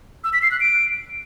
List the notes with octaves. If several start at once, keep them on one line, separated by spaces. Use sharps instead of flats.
E6
B6
C7
F#6
D7